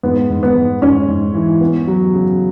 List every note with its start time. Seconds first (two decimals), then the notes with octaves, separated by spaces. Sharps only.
0.03 G#2 B3
0.30 G#2
0.43 B3
0.56 G#2
0.82 G#2 C#4
1.08 G#2
1.34 E3
1.61 B3
1.87 F#3
2.13 C#3